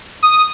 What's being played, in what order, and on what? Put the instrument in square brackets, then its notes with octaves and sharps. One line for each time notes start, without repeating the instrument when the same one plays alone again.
[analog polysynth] D#6